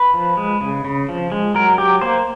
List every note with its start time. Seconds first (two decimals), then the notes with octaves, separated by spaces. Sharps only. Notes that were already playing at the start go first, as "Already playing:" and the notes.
Already playing: B4
0.14 F3
0.37 G#3
0.61 C#3
0.85 C#3
1.09 F3
1.32 G#3
1.55 F#3 A#4
1.78 F#3 G4
2.01 A#3 C5